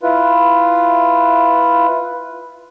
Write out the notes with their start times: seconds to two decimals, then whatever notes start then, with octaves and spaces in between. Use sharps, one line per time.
0.03 E4 F4 B4